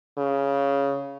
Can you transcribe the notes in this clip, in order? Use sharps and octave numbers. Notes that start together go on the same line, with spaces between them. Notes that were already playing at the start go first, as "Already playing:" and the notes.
C#3